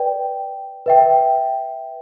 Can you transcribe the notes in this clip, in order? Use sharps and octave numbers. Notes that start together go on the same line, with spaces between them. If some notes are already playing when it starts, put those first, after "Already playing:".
Already playing: B4 D5 G5
B4 E5 G5